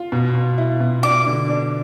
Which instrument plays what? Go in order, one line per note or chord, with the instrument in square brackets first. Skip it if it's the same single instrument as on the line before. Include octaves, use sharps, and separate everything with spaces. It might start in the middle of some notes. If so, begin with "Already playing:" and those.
Already playing: [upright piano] F4
B2
B2
E4
B2
[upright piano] D4 [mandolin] D6
[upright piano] D3
D4